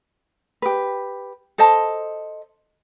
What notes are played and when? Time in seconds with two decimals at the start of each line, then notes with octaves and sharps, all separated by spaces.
0.62 G4 B4
1.58 A4 C5 D#5 A5